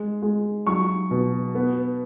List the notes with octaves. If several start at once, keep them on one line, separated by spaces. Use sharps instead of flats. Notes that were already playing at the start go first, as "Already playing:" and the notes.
Already playing: G#3
G#3
F#3 C#6
B2
B3